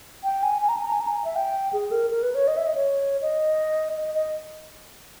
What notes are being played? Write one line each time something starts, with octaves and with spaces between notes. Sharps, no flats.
G5
G#5
G#5
A#5
G#5
A#5
G#5
A#5
G#5
E5
G5
G#4
A#4
A#4
B4
C#5
D#5
E5
D#5
C#5
D#5
D#5
D#5